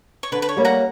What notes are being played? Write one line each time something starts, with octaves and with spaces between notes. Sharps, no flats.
C#5
D3 B4
B4
C#5
G3 A#3 C#4
F#5 A#5